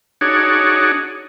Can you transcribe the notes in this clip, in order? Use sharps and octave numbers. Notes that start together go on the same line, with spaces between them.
D4 D#4 F#4 G#4 C#5